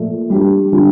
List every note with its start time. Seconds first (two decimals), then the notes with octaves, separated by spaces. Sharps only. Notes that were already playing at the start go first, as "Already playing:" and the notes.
Already playing: A#2 F3 A3
0.30 G3 D4 G4
0.72 D3 G3 D4 F4